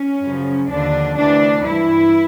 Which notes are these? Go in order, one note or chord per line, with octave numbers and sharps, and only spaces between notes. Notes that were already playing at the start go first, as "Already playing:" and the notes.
Already playing: C#4
F#2 C#3 F3
D#2 D3 F3 D4
D2 C3 E3 D4
G2 E3 E4